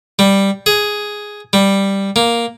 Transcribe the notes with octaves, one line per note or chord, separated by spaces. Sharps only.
G3
G#4
G3
A#3